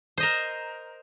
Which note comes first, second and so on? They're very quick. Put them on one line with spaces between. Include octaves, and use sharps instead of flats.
C5 D#5 A#4